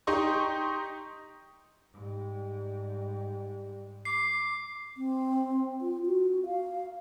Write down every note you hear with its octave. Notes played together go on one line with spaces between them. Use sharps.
D#4 G4 D#5 C6 C#6
G#2 G3
D6 C7
C4
F4
F#4
F5